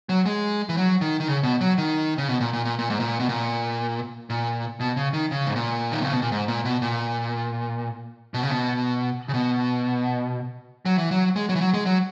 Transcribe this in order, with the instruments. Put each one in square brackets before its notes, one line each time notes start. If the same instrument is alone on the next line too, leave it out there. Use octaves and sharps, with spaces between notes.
[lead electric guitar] F#3
G#3
E3
F#3
D#3
D#3
C#3
B2
F#3
D#3
C#3
B2
A#2
A#2
A#2
A#2
G#2
A#2
B2
A#2
A#2
B2
C#3
D#3
C#3
G#2
A#2
D#3
C#3
B2
A#2
G#2
A#2
B2
A#2
B2
C#3
B2
C#3
B2
F#3
E3
F#3
G#3
F#3
E3
F#3
G#3
F#3